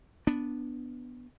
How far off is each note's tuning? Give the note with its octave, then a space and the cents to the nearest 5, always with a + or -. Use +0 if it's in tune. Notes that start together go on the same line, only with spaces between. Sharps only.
B3 +0 D4 +0